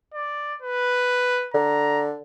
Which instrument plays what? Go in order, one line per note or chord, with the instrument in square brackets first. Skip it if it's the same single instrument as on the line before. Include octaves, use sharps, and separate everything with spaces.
[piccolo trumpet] D5
B4
[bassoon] D3 [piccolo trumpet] A#5